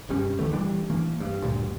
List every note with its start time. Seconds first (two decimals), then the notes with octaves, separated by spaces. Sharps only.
0.09 F1 G2 G3 C#4
0.39 C2 D3 E3 A3
0.53 E3 G3 D4
0.90 E3 A3 A#3
1.20 G2
1.42 D2 G2 A#2